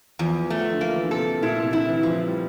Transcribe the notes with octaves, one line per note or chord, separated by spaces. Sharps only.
E2 F3
F3 A3
D3
E3 A#3
F3
E3
D3
C3 A4
A#2 E4
C3
D3 E4
E3
E3 F3
G3